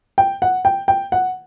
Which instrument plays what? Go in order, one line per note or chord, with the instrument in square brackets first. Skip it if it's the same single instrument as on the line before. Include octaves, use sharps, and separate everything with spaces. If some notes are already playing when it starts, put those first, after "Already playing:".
[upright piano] G5
F#5
G5
G5
F#5